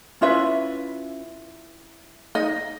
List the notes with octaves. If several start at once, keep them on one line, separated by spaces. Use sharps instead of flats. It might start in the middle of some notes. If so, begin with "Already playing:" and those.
C#4 E4 F4 B4 E5
D#4 D#5